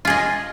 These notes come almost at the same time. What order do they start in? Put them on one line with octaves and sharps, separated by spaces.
F4 G#4 D#5